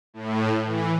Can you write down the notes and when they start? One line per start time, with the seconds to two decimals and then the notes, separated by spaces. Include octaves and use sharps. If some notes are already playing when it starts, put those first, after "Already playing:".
0.14 A2
0.65 E3